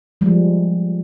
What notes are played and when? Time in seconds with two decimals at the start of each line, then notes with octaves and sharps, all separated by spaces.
0.21 F3 G3 G#3